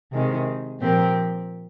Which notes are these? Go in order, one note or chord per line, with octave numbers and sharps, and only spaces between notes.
C3 D#3 G#3
A#2 F3 C4 G4 A#4